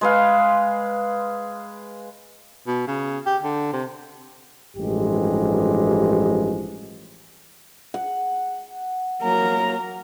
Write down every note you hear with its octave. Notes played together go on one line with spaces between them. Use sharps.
G#3 B4 F5
B2
C#3
G4
D3
C3
A1 G2 F3 G#3 G4
F#5
F#3 A#3 A#4 A#5